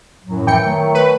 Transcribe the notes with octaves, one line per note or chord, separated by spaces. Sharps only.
F#2 A2 F#3
E3 G5 C#7
D#3 F#3 A3
B4